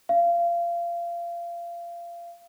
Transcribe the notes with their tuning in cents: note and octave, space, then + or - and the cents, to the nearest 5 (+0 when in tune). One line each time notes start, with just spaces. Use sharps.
F5 -25